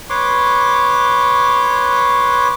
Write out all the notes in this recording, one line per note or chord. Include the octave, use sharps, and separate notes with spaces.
B4 C#5 C6 D6